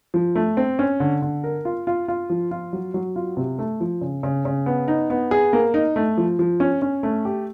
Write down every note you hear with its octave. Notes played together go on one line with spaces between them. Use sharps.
F3
A3
C4
C#4
D3
D3
A#4
F4
F4
F4
F3
F4
F#3
F#3
F4
C3
A3
F3
C#3
C#3
C#3
B3
D#4
B3
G#4
A#3
D#4
A3
F3
F3
C#4
C#4
A3
G4